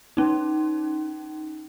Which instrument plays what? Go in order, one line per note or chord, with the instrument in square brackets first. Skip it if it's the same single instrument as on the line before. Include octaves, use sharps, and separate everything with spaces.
[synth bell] C#4 D#4